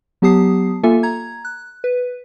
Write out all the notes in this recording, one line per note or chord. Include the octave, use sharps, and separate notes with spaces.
F#3 B3 G4 A5 D#6 C7
A#3 F4 A4 E5 G#5
A#5 G#6
F#6
B4